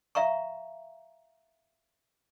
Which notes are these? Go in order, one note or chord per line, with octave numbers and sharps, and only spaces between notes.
E5 F5 A#5 C#6